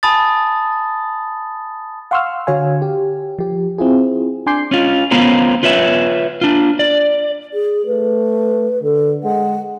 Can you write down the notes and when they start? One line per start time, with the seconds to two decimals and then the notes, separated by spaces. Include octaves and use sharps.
0.03 G#5 A5 B5 D#6 A6
2.11 F5 F#5 C6 C#6 E6 F6
2.47 D3 F#4 C#5 F5 G#5
2.82 G4
3.39 F3 G4
3.78 C4 E4 F4 G#4
4.46 D4 G#5 C6 D6 G6 C7
4.71 C#4 F4
5.11 B3 C#4 F4 A#4 C5
5.63 F4 B4 C#5 E5
6.41 D4 F4
6.79 D5
7.54 G#4
7.86 A3 B4
8.83 D3 A4
9.24 G#3 F#5